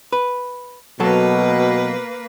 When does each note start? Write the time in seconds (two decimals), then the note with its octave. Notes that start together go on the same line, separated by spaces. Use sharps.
0.13 B4
1.00 B2 F#3 A#3 A4 B4